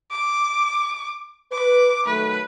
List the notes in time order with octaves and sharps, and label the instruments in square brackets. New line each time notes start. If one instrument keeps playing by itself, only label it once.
[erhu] D6
[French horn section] B4 [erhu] D6
[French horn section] D#3 F#3 A3 [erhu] B4